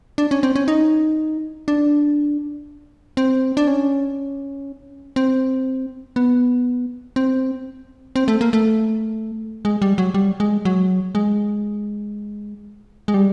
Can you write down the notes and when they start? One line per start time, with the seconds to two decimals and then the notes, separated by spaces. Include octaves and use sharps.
0.18 D4
0.31 C#4
0.43 C4
0.56 C#4
0.68 D#4
1.68 D4
3.17 C4
3.57 D4
3.67 C#4
5.16 C4
6.16 B3
7.16 C4
8.16 C4
8.28 A3
8.41 A#3
8.53 A3
9.65 G#3
9.82 G3
9.98 F#3
10.14 G3
10.40 G#3
10.65 F#3
11.15 G#3
13.08 G#3
13.14 G3